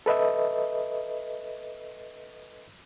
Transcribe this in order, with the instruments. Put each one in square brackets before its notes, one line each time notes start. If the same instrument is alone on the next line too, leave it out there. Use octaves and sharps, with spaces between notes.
[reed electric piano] A4 B4 D#5 E5